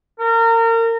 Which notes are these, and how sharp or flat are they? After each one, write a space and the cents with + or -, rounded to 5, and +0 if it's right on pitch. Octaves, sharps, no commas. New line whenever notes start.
A#4 -30